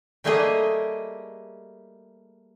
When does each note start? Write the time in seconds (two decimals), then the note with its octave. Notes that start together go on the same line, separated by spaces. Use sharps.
0.24 G3 A3 A#3 G4 G#4 D#5